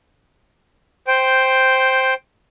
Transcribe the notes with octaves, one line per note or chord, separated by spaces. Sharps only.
C5 G5